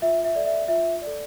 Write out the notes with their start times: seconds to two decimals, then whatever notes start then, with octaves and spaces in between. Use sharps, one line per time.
0.02 F4 E5
0.25 E5
0.35 A4 D5
0.46 E5
0.68 F4 E5
1.02 D5
1.07 A4